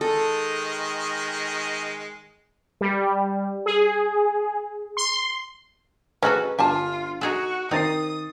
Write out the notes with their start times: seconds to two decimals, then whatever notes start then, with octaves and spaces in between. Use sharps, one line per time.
0.01 D#3 G#3 A4 D#5
2.81 G3
3.66 G#4
4.97 C6
6.22 F#3 C#4 F#4 G#4 A4 B4 D#5 G#5
6.59 G1 F4 G4 G#5 A5
7.21 D#4 F#4 G#4 A4
7.71 D#3 C4 D#4 D#6 A6 C7